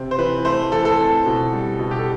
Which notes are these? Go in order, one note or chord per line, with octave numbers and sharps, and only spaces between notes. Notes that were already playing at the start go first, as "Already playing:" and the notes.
Already playing: C3 C4
C5
E3 B4
A3 C5
E3 A4
A4
C4
B2
G3
B2
G4
A4